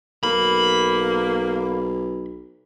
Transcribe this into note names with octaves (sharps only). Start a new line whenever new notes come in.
B1 A#3 B5